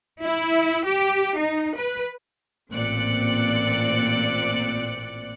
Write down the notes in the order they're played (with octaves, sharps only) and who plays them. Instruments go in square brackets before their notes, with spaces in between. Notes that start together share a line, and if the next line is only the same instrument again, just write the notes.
[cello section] E4
G4
D#4
B4
[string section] A1 A#2 C4 D5 F#6 C#7